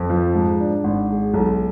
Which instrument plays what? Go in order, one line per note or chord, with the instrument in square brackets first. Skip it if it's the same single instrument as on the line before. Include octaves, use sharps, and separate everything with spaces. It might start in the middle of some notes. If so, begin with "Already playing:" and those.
Already playing: [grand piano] F2
F3
G#2
D4
G#1
G#3
B1